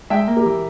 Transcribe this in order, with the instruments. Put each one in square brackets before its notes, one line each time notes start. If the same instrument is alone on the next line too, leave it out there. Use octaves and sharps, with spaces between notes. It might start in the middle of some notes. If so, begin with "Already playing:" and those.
[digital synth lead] G#3 [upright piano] E5 G5
[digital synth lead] A#3
[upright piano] G4 A#4
[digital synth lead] E3